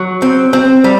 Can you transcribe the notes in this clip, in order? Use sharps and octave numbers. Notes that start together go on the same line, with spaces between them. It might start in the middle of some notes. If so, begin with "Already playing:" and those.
Already playing: F#3
C4
C4
G3